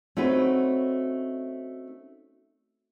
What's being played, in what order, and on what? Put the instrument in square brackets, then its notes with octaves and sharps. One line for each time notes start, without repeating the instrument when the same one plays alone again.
[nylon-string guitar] A3 C4 C#4 D#4 F#4 B4